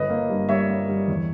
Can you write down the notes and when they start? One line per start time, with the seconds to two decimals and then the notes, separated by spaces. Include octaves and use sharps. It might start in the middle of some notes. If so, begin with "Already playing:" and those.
Already playing: G1 B4 D#5
0.10 A#3
0.29 G2
0.49 G3 C#5 E5
0.69 A#3
0.89 G3
1.08 E2